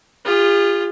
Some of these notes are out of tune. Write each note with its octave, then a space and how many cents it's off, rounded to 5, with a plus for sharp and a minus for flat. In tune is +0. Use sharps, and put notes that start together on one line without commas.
F4 +0 G#4 -45